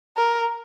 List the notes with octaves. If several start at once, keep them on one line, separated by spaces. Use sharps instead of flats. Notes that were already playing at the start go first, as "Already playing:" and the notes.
A#4